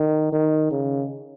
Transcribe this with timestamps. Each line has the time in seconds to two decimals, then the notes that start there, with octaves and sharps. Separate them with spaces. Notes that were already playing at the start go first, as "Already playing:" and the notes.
Already playing: D#3
0.33 D#3
0.71 C#3